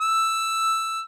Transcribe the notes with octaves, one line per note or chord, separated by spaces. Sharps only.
E6